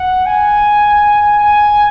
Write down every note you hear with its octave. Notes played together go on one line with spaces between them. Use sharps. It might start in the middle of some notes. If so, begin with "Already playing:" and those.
Already playing: F#5
G#5
G#5